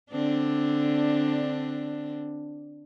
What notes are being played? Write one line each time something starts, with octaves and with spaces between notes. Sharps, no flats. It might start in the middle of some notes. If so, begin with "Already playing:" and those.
D3 C4 D4